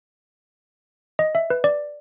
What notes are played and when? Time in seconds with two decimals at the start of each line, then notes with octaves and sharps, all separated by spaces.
1.19 D#5
1.35 E5
1.50 B4
1.64 D5